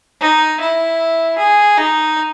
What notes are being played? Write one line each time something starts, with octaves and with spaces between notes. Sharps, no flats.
D#4
E4
G#4
D#4